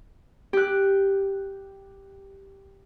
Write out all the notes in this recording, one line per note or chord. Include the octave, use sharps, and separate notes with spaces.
G4 F#6